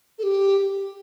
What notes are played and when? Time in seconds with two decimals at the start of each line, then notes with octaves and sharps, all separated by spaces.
0.18 A4
0.23 G4